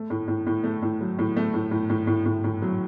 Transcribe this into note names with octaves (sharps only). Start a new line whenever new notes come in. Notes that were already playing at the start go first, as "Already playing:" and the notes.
Already playing: A3
A2
A2
A2
A3
A2
F#3
A2
A3
A2
A2
A2
A2
A2
A2
F#3